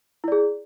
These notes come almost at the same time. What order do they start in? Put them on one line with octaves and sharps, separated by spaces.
E4 D5 G#4